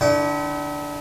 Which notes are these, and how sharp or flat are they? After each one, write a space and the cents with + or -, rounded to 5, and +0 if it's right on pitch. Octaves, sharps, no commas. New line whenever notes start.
D3 -5 E4 -40 G5 -45